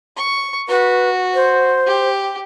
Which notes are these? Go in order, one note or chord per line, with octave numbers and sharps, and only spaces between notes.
C#6
F#4 B4
C5
G4